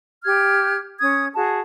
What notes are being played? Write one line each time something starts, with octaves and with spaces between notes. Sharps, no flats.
G4 F6 G#6
C#4 D#6 G#6
F#4 G#4 A5